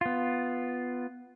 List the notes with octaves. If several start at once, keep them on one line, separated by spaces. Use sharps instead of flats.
B3 F4